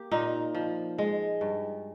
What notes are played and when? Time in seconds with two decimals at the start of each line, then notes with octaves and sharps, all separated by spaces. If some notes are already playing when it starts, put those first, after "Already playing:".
Already playing: A#3 G4
0.11 A#2 D#4
0.55 F3
0.98 G#3
1.41 G2